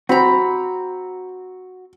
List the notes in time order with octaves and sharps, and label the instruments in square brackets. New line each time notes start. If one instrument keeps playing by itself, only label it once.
[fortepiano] C4 [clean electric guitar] F#4 [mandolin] A#5 B5